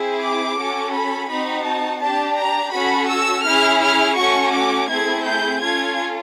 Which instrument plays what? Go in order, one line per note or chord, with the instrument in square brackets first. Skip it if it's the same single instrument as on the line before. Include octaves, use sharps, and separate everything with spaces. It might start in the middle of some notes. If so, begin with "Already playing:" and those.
Already playing: [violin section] C4 E4 G#4
D6
C#4 F#4 A4
B5
C4 D#4 F#4 B5
A5
D4 G4 A5
A#5
C#4 F#4 A4 B5
E6
C#4 E4 G#4 F6
F6
A3 C#4 F#4 C#6
D6
A3 C4 E4 G#4 G#6
G6
C#4 F4 A4 G#6